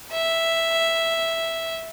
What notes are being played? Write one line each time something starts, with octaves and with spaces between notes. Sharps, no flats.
E5